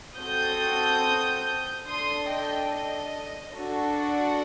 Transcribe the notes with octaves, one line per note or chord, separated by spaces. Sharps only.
C4 F#4 A4 D#6 G6
D4 A4 C6 D#6
D#5 G5
D#5
D4 F#4 A4
D5 F#5